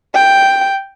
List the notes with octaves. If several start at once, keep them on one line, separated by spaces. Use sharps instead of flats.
G5